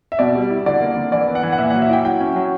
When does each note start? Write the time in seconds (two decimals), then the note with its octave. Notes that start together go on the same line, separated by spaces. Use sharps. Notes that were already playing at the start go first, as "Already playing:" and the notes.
0.12 E5
0.19 B2 D5
0.35 G3
0.50 E4
0.66 D3 D5
0.81 A#3
0.96 D3
1.12 E3 D5
1.28 B3
1.35 F#5
1.43 E3
1.52 F#5
1.58 A#2 E5
1.70 F#3 F#5
1.82 E5
1.89 E4 G5
2.05 F#3 G5
2.20 C#4
2.36 F#3